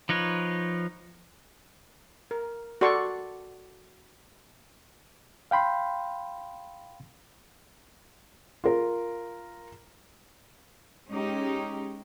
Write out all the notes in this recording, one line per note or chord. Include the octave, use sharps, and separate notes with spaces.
F3 D#4 B4 C#5
A#4
F#4 A4 D5 C6 C#6
F5 G5 B5 C6
F4 A#4
G#3 C#4 D#4 G4